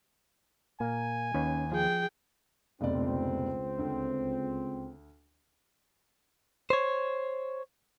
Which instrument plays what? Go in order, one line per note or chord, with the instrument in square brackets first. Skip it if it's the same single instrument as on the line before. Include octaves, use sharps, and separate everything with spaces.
[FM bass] A#2 [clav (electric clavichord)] A#3 [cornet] G#5
[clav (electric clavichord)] D#2 B4 [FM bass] C#4
[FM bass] F3 [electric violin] G#4 G5
[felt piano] F1 B2 D5 [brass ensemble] C#2 C4
[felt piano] D2
[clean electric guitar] C5 C#5